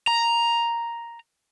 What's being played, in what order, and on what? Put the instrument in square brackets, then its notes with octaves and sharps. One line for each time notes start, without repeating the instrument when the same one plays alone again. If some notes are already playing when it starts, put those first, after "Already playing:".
[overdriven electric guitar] A#5